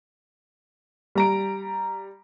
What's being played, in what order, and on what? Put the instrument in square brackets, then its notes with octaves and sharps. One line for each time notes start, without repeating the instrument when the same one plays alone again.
[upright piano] G3 A#5 D7